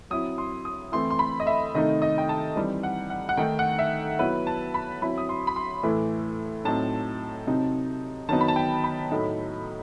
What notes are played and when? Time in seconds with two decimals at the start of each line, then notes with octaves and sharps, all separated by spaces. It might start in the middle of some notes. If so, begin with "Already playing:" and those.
0.10 F#3 C4 E4 D#6
0.38 C6
0.65 D#6
0.92 E3 A3 C4 E4 C6
1.10 C6
1.19 B5
1.40 D#5
1.47 E5
1.74 C3 D#3 A3 D#4 D#5
2.02 D#5
2.18 G5
2.29 A5
2.56 E3 G3 C4 D#4
2.83 F#5
3.10 F#5
3.29 F#5
3.37 D#3 A3 D#4 G5
3.59 F#5
3.79 E5
4.19 F#3 B3 E4 B4
4.47 A5
4.74 B5
5.02 F#3 C4 E4 B5
5.18 D#6
5.29 C6
5.47 B5
5.56 C6
5.83 A2 E3 A3 E4
6.65 A2 F#3 A3 C4 D#4 A5
7.47 C3 F#3 C4 D#4
8.29 D#3 F#3 B3 D#4 A5
8.41 B5
8.48 A5
8.56 G5
8.84 B5
9.11 A2 F#3 A3 D#4